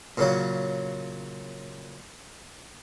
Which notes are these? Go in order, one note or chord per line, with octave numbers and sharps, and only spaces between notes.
A#2 C#3 F#3